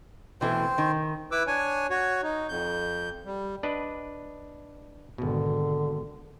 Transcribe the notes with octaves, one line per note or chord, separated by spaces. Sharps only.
B2 E3 A3 C4 C5
D#3
E4 B4 D6 E6
D4 C#5 G#5
F#4 C#5
D#4
F2 G6
G3
D4 B4 D#5
G#1 B2 D3